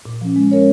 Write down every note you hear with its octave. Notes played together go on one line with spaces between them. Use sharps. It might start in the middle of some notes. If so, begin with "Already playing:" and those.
A#2
F3 C#4
G#3
C#4 A#4 C#5